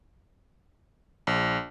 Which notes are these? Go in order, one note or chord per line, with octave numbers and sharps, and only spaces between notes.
A#1